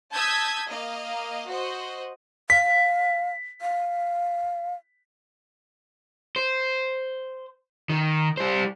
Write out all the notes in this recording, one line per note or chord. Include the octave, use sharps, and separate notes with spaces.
A5 D#6 E6 G6 G#6 B6
A#3 D#5 F5
F#4 C5 D#5
F5 B6
F5
C5
D#3
G3 C5